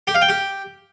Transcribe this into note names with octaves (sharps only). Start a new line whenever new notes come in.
G4
F5
G5
G4